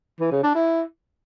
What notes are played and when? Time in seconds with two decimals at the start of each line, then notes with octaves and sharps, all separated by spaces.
0.20 E3
0.32 C#3
0.43 D4
0.55 E4